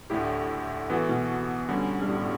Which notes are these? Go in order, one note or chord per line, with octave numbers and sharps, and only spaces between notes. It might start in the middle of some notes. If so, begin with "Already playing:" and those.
D2 A2 D3 A3 E4 G4
E3 B3 F#4 A4
B2
D3 G3 C#4
G2
A2